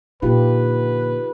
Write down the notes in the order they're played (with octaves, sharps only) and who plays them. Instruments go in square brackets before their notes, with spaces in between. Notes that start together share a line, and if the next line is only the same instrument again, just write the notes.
[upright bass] A#2 D3 [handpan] D#4 F4 G4 [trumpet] B4